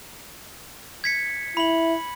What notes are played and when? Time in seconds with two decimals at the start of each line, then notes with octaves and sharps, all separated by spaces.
1.04 G#6 B6 C#7
1.57 E4 B5 F#7